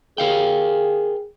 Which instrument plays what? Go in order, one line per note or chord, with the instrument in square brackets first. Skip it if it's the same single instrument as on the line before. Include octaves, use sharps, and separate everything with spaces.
[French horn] G#4 [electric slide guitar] A#4 F5 G5